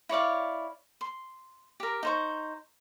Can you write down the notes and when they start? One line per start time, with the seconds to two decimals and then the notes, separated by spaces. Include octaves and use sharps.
0.09 E4 C#5 D5 F5
1.01 C6
1.80 G4 A#4
2.03 D#4 C5 C#6